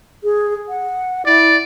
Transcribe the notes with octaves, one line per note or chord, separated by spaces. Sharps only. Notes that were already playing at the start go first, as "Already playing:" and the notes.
G#4
F#5
E4 D5